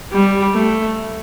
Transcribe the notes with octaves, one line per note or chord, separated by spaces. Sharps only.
G3
A3